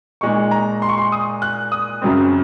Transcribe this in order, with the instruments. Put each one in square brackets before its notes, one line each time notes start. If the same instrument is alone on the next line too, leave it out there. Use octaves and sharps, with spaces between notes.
[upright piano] A#2 G#3 D#4 C#6
A#5
C6
C#6
C6
D#6
F#6
D#6
F#2 C#3 F#3 C4